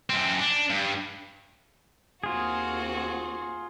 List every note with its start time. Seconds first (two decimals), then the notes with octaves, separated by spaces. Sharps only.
0.10 F#2 C4
0.40 D4
0.70 G2
2.24 D#2 C4 F4 F#4 G#4